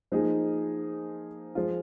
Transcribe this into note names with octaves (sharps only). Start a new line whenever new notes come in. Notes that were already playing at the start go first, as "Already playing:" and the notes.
F3 A#3 D#4 G#4
F3 G#3 F4